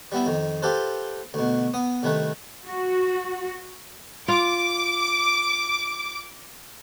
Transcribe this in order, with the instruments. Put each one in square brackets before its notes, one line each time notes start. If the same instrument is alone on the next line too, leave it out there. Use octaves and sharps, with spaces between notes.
[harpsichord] G3 B3 E4
F2 D#3
F4 G4 A4 B4 C5
D2 B2
B3 D#6
C2 D#3 A3 B4
[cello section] F#4
[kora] F4 [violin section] D6